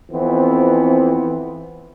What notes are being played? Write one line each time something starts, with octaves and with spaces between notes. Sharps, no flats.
F2 E3 B3 C4